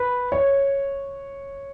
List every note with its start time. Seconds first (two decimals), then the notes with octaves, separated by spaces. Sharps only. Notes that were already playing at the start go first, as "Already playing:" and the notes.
Already playing: B4
0.32 C#5